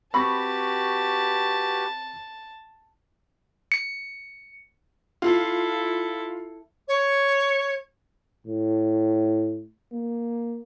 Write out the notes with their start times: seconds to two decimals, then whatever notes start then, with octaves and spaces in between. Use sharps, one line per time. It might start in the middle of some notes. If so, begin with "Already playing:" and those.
0.14 C4 F#4 G4 B4 A5 B5 C#6 A#6
3.72 C#7
5.22 E4 F4 A4
6.88 C#5
8.47 A2
9.93 A#3